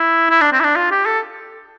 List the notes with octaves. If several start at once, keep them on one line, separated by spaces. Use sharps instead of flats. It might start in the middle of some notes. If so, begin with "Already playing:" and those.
Already playing: E4
E4
D4
C4
E4
D4
F4
G4
A4